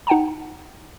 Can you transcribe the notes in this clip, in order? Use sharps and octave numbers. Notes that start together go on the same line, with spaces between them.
D#4 F#5 G5 A5 A#5